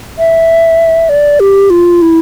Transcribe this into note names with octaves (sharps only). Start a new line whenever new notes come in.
E5
D5
G4
F4
E4